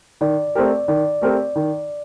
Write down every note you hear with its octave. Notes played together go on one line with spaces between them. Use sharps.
D#3 D5
A3 C4 G4 A#4
D5
D#3 D5
A3 C4 G4 A#4
D#3